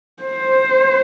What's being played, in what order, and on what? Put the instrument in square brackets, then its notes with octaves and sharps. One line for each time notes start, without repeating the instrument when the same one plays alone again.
[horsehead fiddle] C5